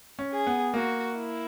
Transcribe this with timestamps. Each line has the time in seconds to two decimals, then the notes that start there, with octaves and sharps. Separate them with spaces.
0.19 C#4
0.32 G#4
0.47 B3
0.74 A#3 F#4
1.16 E4